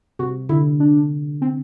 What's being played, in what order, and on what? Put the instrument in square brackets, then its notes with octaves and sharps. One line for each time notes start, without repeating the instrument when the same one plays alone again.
[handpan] C3 [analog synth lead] F#4
[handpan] D3 [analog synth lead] E4
[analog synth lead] D4
C4